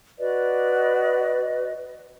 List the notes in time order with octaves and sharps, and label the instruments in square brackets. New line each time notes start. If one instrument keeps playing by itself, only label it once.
[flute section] F#4 B4 D5 D#5